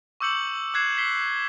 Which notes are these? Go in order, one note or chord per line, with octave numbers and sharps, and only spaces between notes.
C#6 D6 E6 G6 C#7 F#7
D6 F#6 G#6 C7 E7
B6 C7 G7